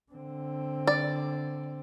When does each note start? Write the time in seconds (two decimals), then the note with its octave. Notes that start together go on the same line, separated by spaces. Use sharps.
0.12 D3 C4
0.87 D5